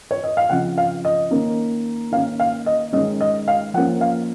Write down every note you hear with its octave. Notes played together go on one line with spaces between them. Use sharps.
C#5
D#5
F5
C#3 F3 C4 F#5
F5
D#5
D#3 A#3 C#4
D#3 A#3 C#4 F5
F5
D#5
D#3 G#3 C#4 D#5
D#5
F5
F3 A#3 C#4 F#5
F5